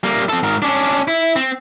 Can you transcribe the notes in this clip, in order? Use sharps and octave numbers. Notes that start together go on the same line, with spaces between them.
G3 A#3
C4 A4
G#2 A#4
C#4 D4
E4
C4